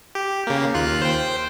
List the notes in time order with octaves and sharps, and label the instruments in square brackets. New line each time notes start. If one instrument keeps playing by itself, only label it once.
[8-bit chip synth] G4
C#3 A#3
D#2 F4 F#6
C5 G5